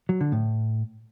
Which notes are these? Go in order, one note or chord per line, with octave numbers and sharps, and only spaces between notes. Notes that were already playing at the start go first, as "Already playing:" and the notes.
F#3
D3
A2